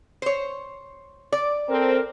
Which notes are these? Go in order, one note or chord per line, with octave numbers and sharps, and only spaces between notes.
C5 C#5
D5
C4 A4 A#4